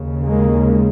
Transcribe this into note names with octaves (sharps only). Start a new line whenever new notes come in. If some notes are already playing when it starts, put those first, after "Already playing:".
Already playing: D#2 C#3
G#3 A#3